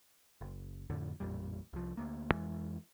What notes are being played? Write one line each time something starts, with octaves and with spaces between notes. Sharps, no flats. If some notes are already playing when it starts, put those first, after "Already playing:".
F#1
F2 A2 D3
A1 F2 A#2 G3
C2 F3
D2 A#3
F2 E3 G#3